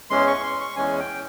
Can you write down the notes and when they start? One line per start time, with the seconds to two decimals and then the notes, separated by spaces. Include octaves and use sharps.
0.10 E2 E3 G#3 C#4 C6
0.27 C#6
0.43 C6
0.60 C#6
0.76 E2 E3 G#3 C#4 G#5
1.00 G5